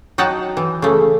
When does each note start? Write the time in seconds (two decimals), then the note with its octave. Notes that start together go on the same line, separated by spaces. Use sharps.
0.18 F#3 D#4 F#5 G5 A5 A#5
0.57 E3
0.82 C#3 A3